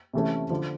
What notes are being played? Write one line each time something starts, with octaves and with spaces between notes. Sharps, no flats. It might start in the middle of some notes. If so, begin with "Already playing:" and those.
C3 E3 A3 C#4
D3 F3